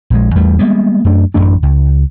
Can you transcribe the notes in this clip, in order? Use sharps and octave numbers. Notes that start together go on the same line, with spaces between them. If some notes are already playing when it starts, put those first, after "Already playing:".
A#1 G#3
E2 G3 A3
G3 G#3 A#3 B3
F#2 A3 D4
A1 F#2 A3 D4
C#2